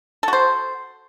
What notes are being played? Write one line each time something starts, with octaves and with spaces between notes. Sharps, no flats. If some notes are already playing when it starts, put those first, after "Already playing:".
F#4 A4 C5